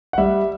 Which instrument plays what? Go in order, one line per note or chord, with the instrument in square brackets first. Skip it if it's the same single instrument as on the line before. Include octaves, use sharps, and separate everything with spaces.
[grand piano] F#5
G3 E5